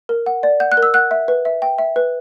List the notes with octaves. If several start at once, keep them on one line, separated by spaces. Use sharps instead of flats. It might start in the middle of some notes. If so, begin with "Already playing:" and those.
A#4
F#5
D5
F#5 G6
F#6
A#4
E6
F#5 F#6
E5
B4
E5
G5
E5
B4